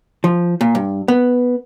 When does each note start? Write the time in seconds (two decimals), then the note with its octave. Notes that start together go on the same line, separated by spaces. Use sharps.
0.24 F3
0.61 A#2
0.75 G2
1.08 B3